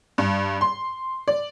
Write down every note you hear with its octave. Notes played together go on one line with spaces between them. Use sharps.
G2
C6
D5